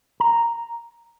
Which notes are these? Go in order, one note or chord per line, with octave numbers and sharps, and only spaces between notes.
A#5